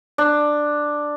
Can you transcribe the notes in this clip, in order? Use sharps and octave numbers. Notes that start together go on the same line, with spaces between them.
D4